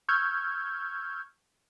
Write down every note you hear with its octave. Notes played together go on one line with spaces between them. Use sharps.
C#6 E6 F6 G6 G#6